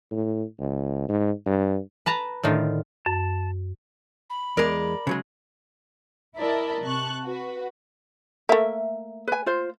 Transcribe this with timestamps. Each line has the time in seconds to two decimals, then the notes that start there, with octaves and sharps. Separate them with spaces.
0.11 A2
0.59 C#2
1.09 G#2
1.46 G2
2.06 B4 A5 A#5
2.43 A2 D3 D#3 F4
3.06 F#2 A5
4.30 B5
4.57 E2 G#3 A#4 D5
5.07 C#3 F#3 G#3
6.36 E4 A#4 D5 D#5 A5 B5
6.83 C3 A5 C#6 F#6
7.24 F#4 B4
8.49 A3 A#3 E5
9.28 B4 G#5
9.46 F4 C5